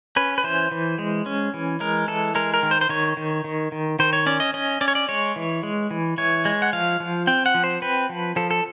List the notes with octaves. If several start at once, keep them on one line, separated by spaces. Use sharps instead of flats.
C#4 B4
B4
E3 C5
E3
G#3
C#4
E3
G#3 A#4
E3 A4
G#3 A#4
A#4
D#3
C5
C5
D#3 C#5
D#3
D#3
D#3
D#3 C5
C#5
C#4 D5
D#5
C#4 D#5
C#4 D5
C#5
D5
G#3 C#5
E3
G#3
E3
E3 C#5
G#3
F#5
F3 F5
F3
C4 G5
F#5
F3
C5
C4 B4
F3
F3 A4
A4